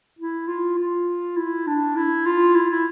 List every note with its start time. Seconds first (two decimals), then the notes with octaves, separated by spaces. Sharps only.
0.19 E4
0.48 F4
0.78 F4
1.37 E4
1.67 D4
1.96 E4
2.26 F4
2.55 E4
2.70 E4